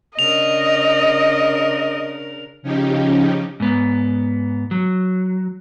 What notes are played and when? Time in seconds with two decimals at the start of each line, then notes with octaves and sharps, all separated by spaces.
0.19 C#3 D4 A#4 D#5 F7
2.62 C#3 F3 C#4 D#4 G4
3.60 G#2 B3
4.71 F#3